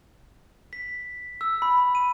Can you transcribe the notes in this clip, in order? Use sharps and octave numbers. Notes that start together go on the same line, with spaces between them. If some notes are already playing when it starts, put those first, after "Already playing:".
B6
E6
B5
D#7